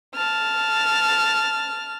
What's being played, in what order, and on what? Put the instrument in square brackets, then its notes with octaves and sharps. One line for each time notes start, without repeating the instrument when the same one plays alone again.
[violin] A5 F6